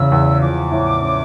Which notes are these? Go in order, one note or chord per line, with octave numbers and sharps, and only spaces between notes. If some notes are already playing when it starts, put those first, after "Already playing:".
Already playing: E2 C#3 E6
E2
F3 D6
A2
C#4